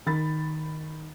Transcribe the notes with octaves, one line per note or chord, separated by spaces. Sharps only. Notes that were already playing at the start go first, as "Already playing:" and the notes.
D#3 B5 A6